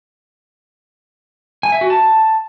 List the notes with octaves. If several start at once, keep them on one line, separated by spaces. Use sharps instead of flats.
G#5
E5
F#4
A5